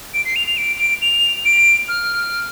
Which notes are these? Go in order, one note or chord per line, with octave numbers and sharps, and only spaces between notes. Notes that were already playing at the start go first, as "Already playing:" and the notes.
D7
C7
F7
F7
D7
D7
F7
D7
F6